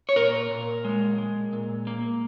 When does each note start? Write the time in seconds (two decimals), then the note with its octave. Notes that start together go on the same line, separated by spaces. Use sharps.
0.09 C#5
0.16 A#2 A#4
0.51 A#2
0.84 G#3
1.18 G#3
1.53 A#2
1.87 A#3